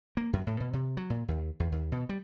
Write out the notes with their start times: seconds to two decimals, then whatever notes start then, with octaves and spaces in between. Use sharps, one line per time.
0.17 A#3
0.33 F#2
0.47 A2
0.60 B2
0.73 C3
0.97 F#3
1.10 A#2
1.28 D#2
1.60 E2
1.72 D#2
1.92 B2
2.09 G3